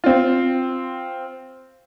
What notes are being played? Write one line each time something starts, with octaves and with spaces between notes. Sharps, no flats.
C4 F4